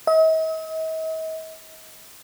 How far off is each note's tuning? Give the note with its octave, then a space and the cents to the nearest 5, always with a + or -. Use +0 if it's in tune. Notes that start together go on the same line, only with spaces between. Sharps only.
D#5 +45